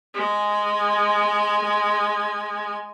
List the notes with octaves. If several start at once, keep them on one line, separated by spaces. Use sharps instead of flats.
G#3 G#5